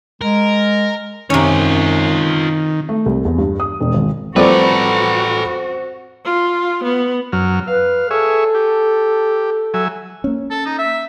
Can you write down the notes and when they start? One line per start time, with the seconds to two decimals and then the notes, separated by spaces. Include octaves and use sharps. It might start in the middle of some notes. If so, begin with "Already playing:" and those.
0.21 G#3 A#4
1.30 F#2 C3 D#3 C#4 F4 C#5
2.89 A3
3.06 C2
3.25 E2
3.38 G2
3.60 D#6
3.80 E1
3.94 G#1
4.36 F3 G3 A3 C4 F#4 A4 B4 D5
6.25 F4
6.84 B3
7.33 F#2 F#3 F6
7.67 B4 F5
8.11 G#4 A4 C#5 E5
8.55 G4
9.74 F#3 E5 G#5
10.24 A#3 C#4
10.50 A4
10.66 D#4
10.78 E5